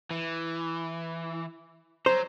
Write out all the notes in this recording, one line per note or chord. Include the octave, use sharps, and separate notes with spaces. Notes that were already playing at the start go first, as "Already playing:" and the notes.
E3
C5 C#5 A#5